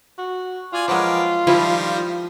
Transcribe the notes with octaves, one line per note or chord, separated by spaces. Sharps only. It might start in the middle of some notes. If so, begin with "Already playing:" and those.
F#4
F4 D5 G#5
F3 F#3 G#3 A#4 B4 D6
D#3 F3 G3 E4